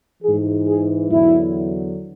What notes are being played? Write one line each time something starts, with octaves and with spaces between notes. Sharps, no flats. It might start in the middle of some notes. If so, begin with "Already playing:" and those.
G#2 E3 G#4
G#4
E2 D3 F#3 E4